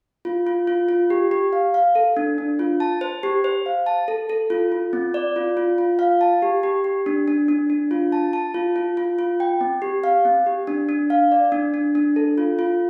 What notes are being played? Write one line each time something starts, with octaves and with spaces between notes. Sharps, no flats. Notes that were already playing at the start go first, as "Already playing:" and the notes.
F4
F4
F4
F4
G4
G4
F5
F5
A4
D4
D4
F4
A5
C5
G4
C5
F5
A5
A4
A4
F4
F4
C4
D5
F4
F4
F4
F5
A5
G4
G4
G4
D4
D4
D4
D4
F4
A5
A5
F4
F4
F4
F4
G5
C4
G4
F5
C4
G4
D4
D4
F5
D5
D4
D4
D4
A4
F4
F4